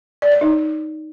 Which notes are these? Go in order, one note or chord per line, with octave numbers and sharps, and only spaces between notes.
D5
C#5
D#4